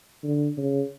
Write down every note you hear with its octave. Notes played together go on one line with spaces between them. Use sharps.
D3
C#3